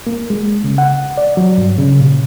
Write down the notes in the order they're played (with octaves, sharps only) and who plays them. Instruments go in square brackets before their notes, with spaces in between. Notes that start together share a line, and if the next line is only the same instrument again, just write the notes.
[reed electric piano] A#3
G#3
C#3
F#5
D5
F#3
G2
C#3
A#2